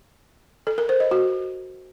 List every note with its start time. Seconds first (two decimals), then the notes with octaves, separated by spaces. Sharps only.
0.67 A4
0.78 A#4
0.89 C5
1.00 D#5
1.11 F#4